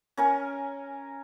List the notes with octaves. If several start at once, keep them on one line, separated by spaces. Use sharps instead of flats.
C#4 A#4 G#5